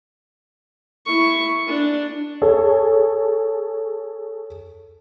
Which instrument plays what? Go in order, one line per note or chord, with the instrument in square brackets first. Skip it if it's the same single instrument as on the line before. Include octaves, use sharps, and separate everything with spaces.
[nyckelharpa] E4 C#6
D4
[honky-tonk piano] G#4 A4 C#5